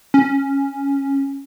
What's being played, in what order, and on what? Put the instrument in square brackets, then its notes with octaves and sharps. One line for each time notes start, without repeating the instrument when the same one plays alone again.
[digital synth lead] C#4